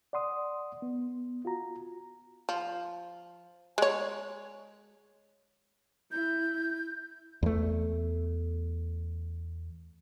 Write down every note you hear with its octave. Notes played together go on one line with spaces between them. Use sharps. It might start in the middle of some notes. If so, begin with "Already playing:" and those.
D5 F#5 C6 D#6
B3
F4 F#4 A#5
F3
G#3 C#5
E4 G6
E2 A3